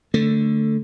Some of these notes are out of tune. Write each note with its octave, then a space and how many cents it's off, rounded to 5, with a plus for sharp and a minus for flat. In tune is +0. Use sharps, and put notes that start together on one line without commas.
D3 +0 A3 +5